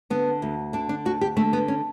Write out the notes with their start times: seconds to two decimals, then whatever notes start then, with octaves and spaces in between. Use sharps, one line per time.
0.10 D3 B3
0.42 D2
0.73 D3 D4
0.89 D4
1.05 D2 F#4
1.21 G4
1.37 D3 A3
1.53 B3
1.68 C#4